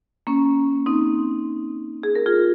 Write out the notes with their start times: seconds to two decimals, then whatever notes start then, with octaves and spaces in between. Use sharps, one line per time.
0.27 A#3 C#4
0.86 C4 D#4
2.03 G#4
2.15 A#4
2.26 F4 G#4